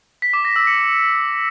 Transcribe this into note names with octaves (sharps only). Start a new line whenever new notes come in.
B6
D6
A#6
E6
C#7